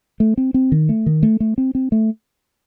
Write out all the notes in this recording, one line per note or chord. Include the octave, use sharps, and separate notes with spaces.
A3
C4
C4
D#3
A3
D#3
A3
A3
C4
C4
A3